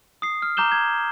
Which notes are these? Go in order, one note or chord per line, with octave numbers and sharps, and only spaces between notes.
D#6 C7
F6
A#5 D6 G6 E7 G7
G#6